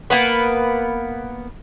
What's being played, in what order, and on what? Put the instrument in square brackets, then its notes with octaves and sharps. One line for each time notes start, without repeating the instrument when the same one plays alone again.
[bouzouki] A#3 B3 B4